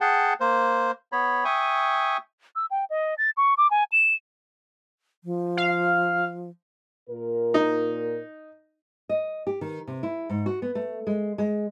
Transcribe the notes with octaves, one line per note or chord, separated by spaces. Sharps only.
G#4 F#5 G5 A5
A#3 C5
B3 C#5 B5
E5 G5 G#5 C#6 D#6
E6
G5
D#5
A6
C#6
D6
G#5
E7
F3
F5
A#2 A#4
D#4
D#5
G4
D#3
C3
E4
G#2
F#4
B3
A3
G#3
G#3